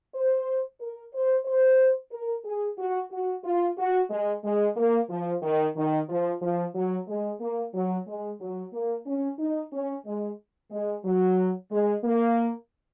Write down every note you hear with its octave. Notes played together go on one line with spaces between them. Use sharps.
C5
A#4
C5
C5
A#4
G#4
F#4
F#4
F4
F#4
G#3
G#3
A#3
F3
D#3
D#3
F3
F3
F#3
G#3
A#3
F#3
G#3
F#3
A#3
C#4
D#4
C#4
G#3
G#3
F#3
G#3
A#3